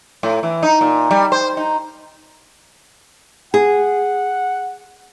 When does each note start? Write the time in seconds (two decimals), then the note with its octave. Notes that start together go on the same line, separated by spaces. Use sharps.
0.23 A2
0.43 E3
0.63 D#4
0.81 A#2
1.11 G3
1.32 C5
1.57 D#4
3.54 G#4 F#5